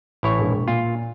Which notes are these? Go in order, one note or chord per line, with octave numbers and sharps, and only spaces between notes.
A1 E4 C#5
E1 A#1
A#2 F4